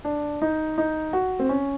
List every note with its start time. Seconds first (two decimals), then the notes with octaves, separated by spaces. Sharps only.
0.05 D4
0.42 D#4
0.78 D#4
1.13 F#4
1.39 C4
1.49 C#4